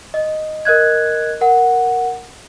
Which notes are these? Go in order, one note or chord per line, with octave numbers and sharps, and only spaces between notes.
D#5
A#4 D#5 F#6 G#6
A#4 F#5